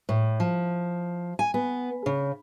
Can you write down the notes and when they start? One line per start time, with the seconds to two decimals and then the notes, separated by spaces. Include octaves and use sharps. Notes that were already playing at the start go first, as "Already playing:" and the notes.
0.09 A2
0.40 F3
1.39 G#5
1.54 B3
2.06 C#3